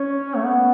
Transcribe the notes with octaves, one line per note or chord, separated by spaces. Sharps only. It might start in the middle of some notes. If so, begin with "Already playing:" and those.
Already playing: C#4
A3
B3